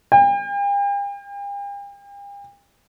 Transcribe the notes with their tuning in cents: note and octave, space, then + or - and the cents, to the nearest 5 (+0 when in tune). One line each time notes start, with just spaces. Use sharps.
G5 +45